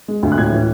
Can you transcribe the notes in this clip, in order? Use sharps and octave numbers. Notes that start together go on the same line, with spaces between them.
G#3
D2
F#6
A2 G#6
E3